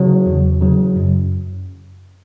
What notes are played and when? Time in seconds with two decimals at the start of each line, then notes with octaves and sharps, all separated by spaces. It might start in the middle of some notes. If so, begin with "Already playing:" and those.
Already playing: C#3 F#3
0.26 E2
0.61 C#3 F#3
0.96 F#2